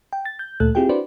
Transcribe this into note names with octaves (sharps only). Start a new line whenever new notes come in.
G5
A6
G6
D2 A#2 A3 A4 F#6
C4 E4 F4 G4 G#4 G5
D4 E4 F#4 B4 C5 D5